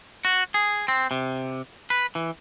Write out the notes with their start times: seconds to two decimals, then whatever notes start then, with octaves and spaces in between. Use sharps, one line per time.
0.25 F#4
0.54 G#4
0.88 C4
1.11 C3
1.90 B4
2.15 E3